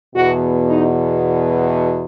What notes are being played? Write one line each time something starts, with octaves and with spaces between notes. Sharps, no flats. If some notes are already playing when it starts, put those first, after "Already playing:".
E2 B2 F#4
D#4